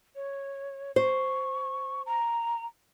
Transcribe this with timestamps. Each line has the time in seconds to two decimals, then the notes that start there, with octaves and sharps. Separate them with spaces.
0.15 C#5
0.96 C5 C#6
2.06 A#5